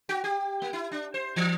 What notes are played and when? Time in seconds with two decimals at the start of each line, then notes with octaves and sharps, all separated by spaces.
0.09 F#4
0.24 G4
0.62 A#3
0.73 E4
0.92 D4
1.14 C5
1.36 E3